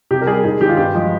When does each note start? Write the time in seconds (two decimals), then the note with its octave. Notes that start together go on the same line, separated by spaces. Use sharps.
0.11 C3 G4
0.21 A#4
0.27 G3 G#4
0.44 G#2 G#4
0.61 D#3 G#3 G4
0.69 F4
0.77 G2 G4
0.94 F3 G#3